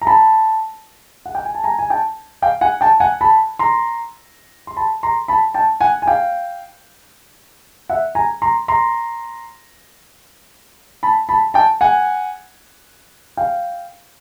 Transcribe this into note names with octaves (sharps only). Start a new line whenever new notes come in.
A#5
A5 B5
F#5
G5
G#5
A5
G#5 A#5
G#5
G5 A5
F5 G5
F#5 G#5
G5 A5
F#5 G#5
A5 B5
A#5 C6
C6
A5 B5
A#5 C6
A5 B5
G5 A5
F#5 G#5
G#5
F5 G5
E5 F#5
G#5 A#5
A#5 C6
A#5 C6
A5 B5
A5 B5
G5 A5
F#5 G#5
F5 G5